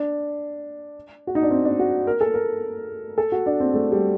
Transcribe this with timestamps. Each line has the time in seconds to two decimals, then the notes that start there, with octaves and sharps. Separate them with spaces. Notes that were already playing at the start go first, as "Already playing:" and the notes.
Already playing: D4
1.27 F#4
1.35 D#4
1.43 D4
1.51 C4
1.65 D4
1.79 F#4
2.07 A#4
2.21 A4
2.34 A#4
3.18 A4
3.32 F#4
3.46 D4
3.60 C4
3.74 A3
3.92 G3